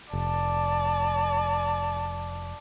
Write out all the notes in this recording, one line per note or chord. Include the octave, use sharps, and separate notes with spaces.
F1 D5 A5